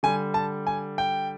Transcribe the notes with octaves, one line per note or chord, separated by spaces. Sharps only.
D3 G3 G#5
A5
G#5
G5